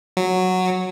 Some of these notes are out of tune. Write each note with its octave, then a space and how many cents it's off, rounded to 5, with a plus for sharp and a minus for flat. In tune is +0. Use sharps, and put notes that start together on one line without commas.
F#3 -5